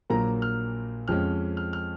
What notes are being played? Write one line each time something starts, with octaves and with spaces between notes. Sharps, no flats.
A#1 A#2 F#3 A#3 A#5
F6
F2 F3 G#3 C#4 F6
F6
F6